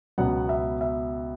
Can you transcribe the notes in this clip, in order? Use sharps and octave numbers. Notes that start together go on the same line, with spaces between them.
C#2 B2 F#3 B3 F#5
E5
E5